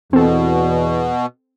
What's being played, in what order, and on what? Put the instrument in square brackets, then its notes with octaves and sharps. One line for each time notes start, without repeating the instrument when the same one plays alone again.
[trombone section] E2 [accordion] B2 [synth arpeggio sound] C4 A4